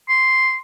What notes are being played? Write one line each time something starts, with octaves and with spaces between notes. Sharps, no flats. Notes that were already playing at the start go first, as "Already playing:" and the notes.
C6